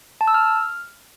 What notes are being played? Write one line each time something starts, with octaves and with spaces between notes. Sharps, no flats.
A5
E6
F6